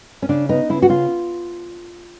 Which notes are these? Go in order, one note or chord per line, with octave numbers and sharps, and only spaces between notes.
C#4
C#3 D4
B3 D#4
C#3 E4
F#4
C#3 F4